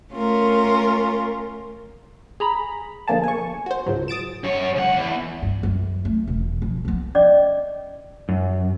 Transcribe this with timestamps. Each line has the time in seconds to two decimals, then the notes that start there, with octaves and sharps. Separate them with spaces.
0.13 A3 C#4 F4 A#4
2.40 G#4 A#5 B5
3.08 B2 D3 F3 A#3 G#4 A5
3.24 G#5 C#6
3.66 F#4 C5
3.86 C#2 G#2 F#3
4.08 D#6 A6 D7 E7
4.44 F#2 C#5
4.76 C#2 F#5
4.97 E2
5.42 G2
5.63 F#2
6.05 A3
6.27 E1
6.62 F3
6.85 F3 B3
7.15 C#4 D5 D#5 D6
8.29 F#2